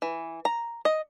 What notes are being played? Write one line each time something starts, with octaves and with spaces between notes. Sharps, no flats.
E3
A#5
D#5